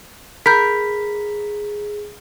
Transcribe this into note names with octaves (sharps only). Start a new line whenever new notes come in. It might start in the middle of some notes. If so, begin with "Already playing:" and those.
G#4 A#4 B5 G6 B6